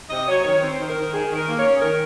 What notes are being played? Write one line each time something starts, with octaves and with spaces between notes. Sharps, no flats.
C3 D#5
F#3 C#5
D#3 C#5
C4 C5
D#3
A#4
D#3
D#3 G#4
D#3
A#4
A#3
C#5
C#4
G#4
D#3 A#4